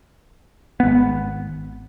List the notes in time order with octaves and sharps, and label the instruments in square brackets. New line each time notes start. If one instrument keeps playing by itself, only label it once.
[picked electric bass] G#1 B3